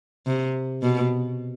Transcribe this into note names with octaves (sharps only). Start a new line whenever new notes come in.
C3
B2